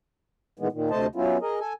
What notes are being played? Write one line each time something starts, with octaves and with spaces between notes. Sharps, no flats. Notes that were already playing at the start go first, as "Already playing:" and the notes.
A#2 D#3 E3 G#3 B3
A#2 D#3
D2 C3 A3 C5 D#5 A5
F#3 B3 C#4 E4 F4
G#4 A#4 D#5
A4 G#5